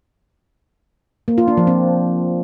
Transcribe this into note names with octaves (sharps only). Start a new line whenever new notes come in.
A#3
F4
D4
F3
C4